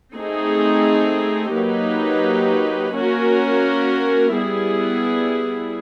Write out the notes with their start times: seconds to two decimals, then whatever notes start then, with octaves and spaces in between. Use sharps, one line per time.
0.13 A3 C4 D#4 G#4
1.53 F#3 A#3 D#4 G4 B4
2.93 A#3 C#4 F#4 A#4
4.32 G3 B3 E4 G#4